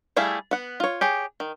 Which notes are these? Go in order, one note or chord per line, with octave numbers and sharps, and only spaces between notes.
G3 A3 E4 G#4 F5
B3 F#5
F4 C#5
G4 G#4 C#5
D#3